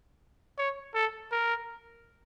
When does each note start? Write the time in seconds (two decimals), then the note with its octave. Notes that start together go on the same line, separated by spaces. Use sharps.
0.58 C#5
0.94 A4
1.32 A#4